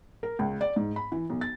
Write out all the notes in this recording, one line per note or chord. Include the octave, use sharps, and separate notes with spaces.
A#4
C#2
D5
G#2
B5
E3
B1
A6